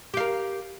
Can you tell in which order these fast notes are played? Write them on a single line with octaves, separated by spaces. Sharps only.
G4 F5 A#4